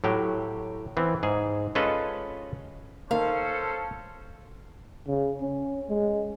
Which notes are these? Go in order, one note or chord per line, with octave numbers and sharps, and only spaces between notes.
A2 F#3 G4
E3 B3 C4
G#2 G#4
G#3 C#4 F4 A4 B4 D#5
D#3 A#3 C#4 A4 C5 F5
C#3
C#4
G#3